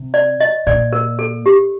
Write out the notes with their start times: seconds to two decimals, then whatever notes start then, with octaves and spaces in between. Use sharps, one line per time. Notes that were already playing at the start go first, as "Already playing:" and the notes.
Already playing: C3
0.14 D5
0.40 D#5
0.67 A#2 D5
0.93 A#4
1.19 A4
1.46 G4